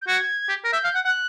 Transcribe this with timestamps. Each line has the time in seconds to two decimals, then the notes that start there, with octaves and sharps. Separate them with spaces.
0.02 G6
0.07 F#4 G#6
0.49 G4
0.64 A#4
0.72 E5 G6
0.84 F5
0.95 F#5
1.05 F#5 F#6